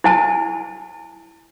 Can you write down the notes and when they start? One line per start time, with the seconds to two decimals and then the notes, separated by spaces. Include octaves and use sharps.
0.04 E4 G#5 A5